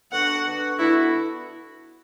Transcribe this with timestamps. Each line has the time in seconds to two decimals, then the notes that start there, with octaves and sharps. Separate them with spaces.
0.12 D3 B3 D4 F#4 F#5
0.45 D3 B3 D4 F#4
0.79 D3 B3 D4 E4 F#4